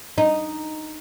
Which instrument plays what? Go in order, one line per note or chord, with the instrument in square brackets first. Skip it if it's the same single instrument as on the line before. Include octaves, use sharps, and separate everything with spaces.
[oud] D#4